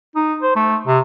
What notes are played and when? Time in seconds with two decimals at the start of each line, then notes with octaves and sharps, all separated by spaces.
0.15 D#4
0.42 C5
0.56 A3
0.87 C3